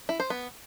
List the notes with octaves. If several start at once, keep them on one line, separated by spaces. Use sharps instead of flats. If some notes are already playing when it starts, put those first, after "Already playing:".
E4
C5
B3